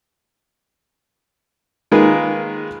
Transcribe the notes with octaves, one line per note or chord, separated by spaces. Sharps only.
D#3 G#3 A#3 F4 G#4 B4